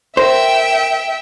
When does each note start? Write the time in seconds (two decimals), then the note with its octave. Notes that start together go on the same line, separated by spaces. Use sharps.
0.17 A#4 C5 E5 G5